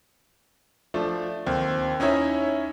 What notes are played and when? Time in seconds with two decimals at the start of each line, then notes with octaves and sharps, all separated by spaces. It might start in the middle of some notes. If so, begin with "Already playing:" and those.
0.94 F3 A3 D4
1.46 D#2 C4
2.00 C#4 D#4 E4 C#5 E5